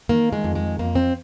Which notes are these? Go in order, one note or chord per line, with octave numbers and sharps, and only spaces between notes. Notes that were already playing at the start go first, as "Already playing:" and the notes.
D#3 A#3
G#3
F2
G#3
F2 A#3
C4